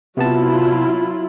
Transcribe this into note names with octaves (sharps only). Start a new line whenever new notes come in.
C3 F#3 B3 E4 F4 A5